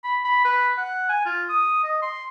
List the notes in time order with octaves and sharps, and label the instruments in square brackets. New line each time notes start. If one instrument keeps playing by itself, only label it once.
[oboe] B5
B5
B4
F#5
G#5
F4
D#6
D#5
C6